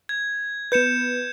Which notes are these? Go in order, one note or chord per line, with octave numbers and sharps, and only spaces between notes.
G#6
B3 B4 G6 C#7 E7